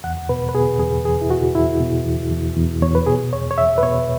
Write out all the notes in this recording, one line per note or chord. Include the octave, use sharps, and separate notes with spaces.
E2 F#5
B2 B4
B4
B2 G#4
E2 G#4
E2 G#4
E4
B2 F#4
E2 E4
B2
E2
E2
E2
E2 C#5
B4
B2 G#4
E2 C#5
C#5
E2 E5
B4
B2 C#5